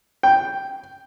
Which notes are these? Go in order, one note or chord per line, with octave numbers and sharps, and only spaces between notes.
G5